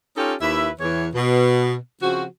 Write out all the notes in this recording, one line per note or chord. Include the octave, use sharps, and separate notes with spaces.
C#4 D#4 F4 G4 A4 C#5
D#2 E4 B4 E5
E2 E3 C#5
B2
C#3 F3 C4 F#4